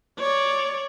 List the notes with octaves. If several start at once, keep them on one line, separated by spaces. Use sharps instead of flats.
C#5 D5